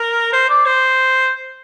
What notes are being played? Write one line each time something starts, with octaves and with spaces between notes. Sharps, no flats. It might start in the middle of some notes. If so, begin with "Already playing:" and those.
Already playing: A#4
C5
D5
C5